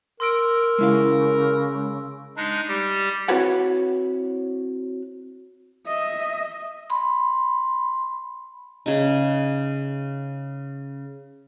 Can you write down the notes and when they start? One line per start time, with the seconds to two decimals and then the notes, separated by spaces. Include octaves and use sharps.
0.20 A#4 C6 E6 D7
0.78 C#3 G#3 E4 F5
2.37 G#3 D4 D#4
2.68 G3 G4
3.28 C4 E4 F#4 B4 C#5 F#5
5.87 D#5 E5
6.90 B5 C6
8.86 C#3 D#4